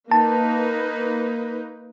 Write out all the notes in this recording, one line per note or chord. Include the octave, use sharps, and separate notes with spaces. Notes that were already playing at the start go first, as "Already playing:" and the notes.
A#3 D#4 B4 A5